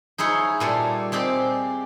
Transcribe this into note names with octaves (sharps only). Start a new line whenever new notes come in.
D#4 E4 G#4 C#5
A#2 G3 A4
G#3 C4 G4 D5